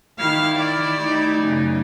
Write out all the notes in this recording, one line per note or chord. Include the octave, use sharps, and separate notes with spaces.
D#3 E4 G4 F5
D5
A3 D#4
F#2 C#3